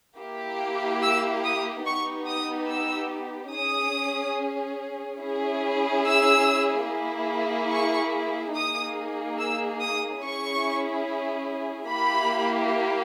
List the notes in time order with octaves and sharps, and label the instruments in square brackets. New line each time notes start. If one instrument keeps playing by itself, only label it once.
[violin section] A#3 E4 G4
E6
D#6
B3 D#4 G4 C#6
D#6
E6
C#4 G#4 D#6
C#4 E4 G#4
E6
A#3 E4 G#4
C#6
A#3 D#4 G#4 D#6
E6
D#6
C#4 E4 G#4 C#6
A#3 E4 G4 B5